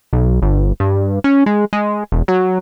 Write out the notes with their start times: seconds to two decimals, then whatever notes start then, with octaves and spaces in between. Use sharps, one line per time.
0.13 B1
0.42 G1
0.80 G2
1.24 C#4
1.46 G#3
1.73 G#3
2.12 E1
2.28 F#3